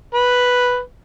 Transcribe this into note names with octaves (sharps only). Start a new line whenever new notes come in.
B4